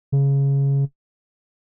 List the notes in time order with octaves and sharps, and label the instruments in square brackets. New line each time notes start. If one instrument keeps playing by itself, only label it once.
[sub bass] C#3